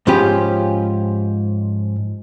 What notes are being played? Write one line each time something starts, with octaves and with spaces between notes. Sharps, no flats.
G#2 F3 C#4 F4 G4 B5